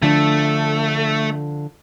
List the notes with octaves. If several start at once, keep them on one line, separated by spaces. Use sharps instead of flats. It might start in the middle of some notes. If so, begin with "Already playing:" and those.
D3 F3 A3 D4